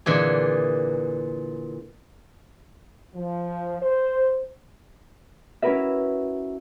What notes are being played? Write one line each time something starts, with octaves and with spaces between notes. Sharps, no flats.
A#2 D3 E3 G#4
F3
C5
C#4 E4 F#4 A#4 B4 E5